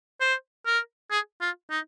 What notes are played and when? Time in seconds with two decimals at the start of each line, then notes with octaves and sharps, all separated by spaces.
0.21 C5
0.66 A#4
1.11 G#4
1.41 F4
1.70 D#4